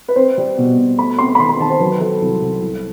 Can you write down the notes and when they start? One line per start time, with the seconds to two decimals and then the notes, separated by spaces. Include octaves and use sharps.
0.08 B4
0.16 C4 C5
0.38 G3
0.58 B2
0.78 B2
0.98 A3 B5
1.19 C4 C6
1.35 B5
1.39 D#3 C6
1.49 B5
1.59 D#3 A5
1.70 C5
1.80 F#3 B4
2.00 F#3 A4
2.22 C2
2.42 C2
2.62 C2